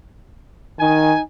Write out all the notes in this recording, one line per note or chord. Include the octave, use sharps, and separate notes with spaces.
D#3 D#4 G#5